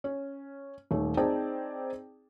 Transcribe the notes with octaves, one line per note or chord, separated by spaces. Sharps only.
C#4
D#1 D#3 A3 C#5
C4 D#4 G#4 D5 G5 A5